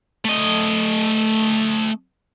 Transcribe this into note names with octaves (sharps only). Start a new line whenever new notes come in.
A3 D#5